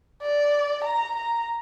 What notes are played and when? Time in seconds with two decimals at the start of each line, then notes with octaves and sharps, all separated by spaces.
0.22 D5
0.84 A#5
1.16 A#5